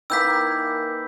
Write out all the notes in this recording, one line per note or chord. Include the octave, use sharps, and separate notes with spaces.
D#3 E3 A#3 E6 G6 B6